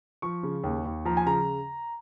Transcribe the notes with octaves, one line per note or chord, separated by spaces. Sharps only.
F3 C#6
C#3
D#2
D#2
F3 A#5
G#5
C#3 A#5